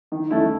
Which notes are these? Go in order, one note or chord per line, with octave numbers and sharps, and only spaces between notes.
D#3
A3 C#4 E4